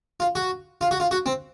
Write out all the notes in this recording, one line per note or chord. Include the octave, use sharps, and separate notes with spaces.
F4
F#4
F4
F#4
F4
F#4
C4